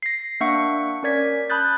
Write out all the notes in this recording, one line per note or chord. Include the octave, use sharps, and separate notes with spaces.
A#6 C7
A#3 D4 E5 F#5 C#6 C#7
C#4 A#4 D5 G#6 B6
A5 B5 D#6 F#6 G6 A6